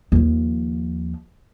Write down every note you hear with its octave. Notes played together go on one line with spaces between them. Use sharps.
D#2 F3